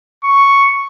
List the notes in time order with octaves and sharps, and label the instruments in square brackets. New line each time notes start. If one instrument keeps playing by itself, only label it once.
[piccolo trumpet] C#6